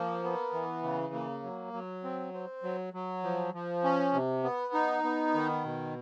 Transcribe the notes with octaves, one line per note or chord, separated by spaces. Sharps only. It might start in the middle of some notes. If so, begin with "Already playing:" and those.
Already playing: F3 A#3
B3
E3
C#3
A#3
F#3
F#3
C4
C4
F#3
F#3
F3
F3
C#4
C3
B3
D#4
B3
D#3
B2